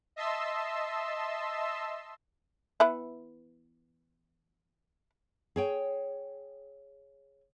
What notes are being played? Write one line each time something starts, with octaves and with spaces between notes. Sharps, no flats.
D#5 E5 A5 C6 E6
E3 B3 E4
G#4 C#5 G5